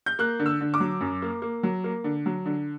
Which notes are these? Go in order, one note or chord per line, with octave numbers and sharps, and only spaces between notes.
G6
A#3 F#6
D3
E6
D3
D6
F#3
F#2
A#3
A#3
F#3
A#3
D3
F#3
D3